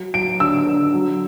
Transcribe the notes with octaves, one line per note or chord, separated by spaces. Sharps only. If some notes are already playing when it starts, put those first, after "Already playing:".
Already playing: F#3
F#3 D7
D3 E6
D3
F#3